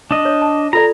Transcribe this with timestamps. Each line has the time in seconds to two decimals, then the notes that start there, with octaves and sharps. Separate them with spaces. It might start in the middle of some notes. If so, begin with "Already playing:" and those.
0.11 D4 D#5
0.25 C#5
0.42 A5
0.73 F4 A4 D5 A#5